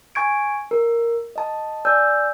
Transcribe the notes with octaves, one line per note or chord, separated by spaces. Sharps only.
G#5 C#6 G#6 D7
A#4
D#5 A5
D5 G#5 E6 G6